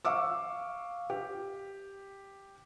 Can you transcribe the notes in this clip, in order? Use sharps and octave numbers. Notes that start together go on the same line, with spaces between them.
F5 C#6 D6 E6
G4